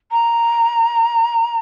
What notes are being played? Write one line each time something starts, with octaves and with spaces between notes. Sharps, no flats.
A#5